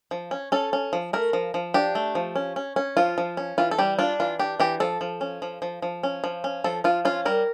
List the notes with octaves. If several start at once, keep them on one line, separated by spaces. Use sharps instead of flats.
F3
C#4
C#4 A4
C#4
F3
A3 A#4
F3
F3
D4 G4
A3
F3
C#4
C#4
C#4
F3 F4
F3
C#4
E3 F4
A4
G3 G4
D4 F4
E3 F4
D4 G4
E3 G4
F3 A4
F3
C#4
F3
F3
F3
C#4
F3
C#4
F3 A4
F3 F4
C#4 F4
G3 A#4